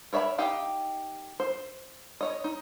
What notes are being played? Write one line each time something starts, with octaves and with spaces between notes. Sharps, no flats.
A#4 C#5 E5 G5 B5
D#4 G4 F5 G5
C5
C#5 D#5
D#4